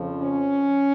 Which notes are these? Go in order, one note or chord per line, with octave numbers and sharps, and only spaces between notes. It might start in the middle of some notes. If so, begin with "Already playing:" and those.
Already playing: F2 C#3 F3
C#4